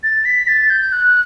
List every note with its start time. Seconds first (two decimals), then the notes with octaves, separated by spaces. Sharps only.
0.03 A6
0.25 B6
0.48 A6
0.70 G6
0.92 F#6